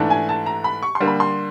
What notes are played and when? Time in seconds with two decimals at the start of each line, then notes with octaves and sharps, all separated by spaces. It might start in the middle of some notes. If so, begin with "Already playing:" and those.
Already playing: G#2 E3 A3 D4
0.10 G#5
0.29 A5
0.46 A#5
0.64 B5
0.83 C#6
0.95 C6
1.00 D3 G3 A#3
1.07 B5
1.20 C6